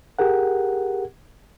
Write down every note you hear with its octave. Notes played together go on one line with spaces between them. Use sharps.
G4 G#4 A#4 F#5